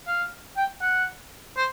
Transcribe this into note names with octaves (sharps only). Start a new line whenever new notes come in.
F5
G5
F#5
C5